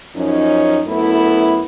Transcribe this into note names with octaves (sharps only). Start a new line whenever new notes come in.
F#2 F3 C#4 D#4
F#2 A3 B3 E4